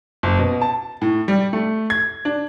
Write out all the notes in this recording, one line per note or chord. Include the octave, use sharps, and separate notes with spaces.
F#1
B2
A5
A2
G3
A3
G#6
D4